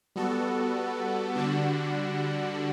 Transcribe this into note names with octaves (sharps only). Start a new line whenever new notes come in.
G3 B3 F#4 A4
D3 G3 D4 F#4